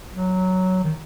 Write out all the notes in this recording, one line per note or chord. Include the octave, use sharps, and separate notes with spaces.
F#3
D#3